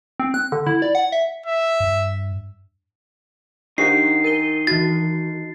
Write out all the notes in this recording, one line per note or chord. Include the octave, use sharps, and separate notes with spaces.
C4
F#6
D3
E4
D5
F#5
E5
E5
G2
D#3 D4 D#4 G4 F#5 C7
A#4 D#7 G7
E3 F#4 A6